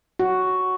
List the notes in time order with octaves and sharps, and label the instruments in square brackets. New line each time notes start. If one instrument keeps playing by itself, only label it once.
[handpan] F#4